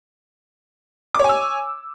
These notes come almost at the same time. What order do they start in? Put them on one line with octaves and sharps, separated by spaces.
D6 C#5 G#5 E6